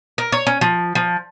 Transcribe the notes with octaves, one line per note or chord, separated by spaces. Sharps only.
A#4
C#5
C#4
F3
F3